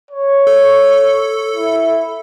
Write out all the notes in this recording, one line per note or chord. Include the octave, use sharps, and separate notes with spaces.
C#5
A4
E4